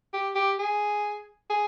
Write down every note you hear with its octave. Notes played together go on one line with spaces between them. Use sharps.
G4
G4
G#4
G#4